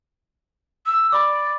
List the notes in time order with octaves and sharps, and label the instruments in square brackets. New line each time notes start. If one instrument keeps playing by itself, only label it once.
[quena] E6
[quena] D5 [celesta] B5 D6